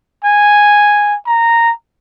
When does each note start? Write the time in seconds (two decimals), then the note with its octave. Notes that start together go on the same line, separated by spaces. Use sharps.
0.24 G#5
1.25 A#5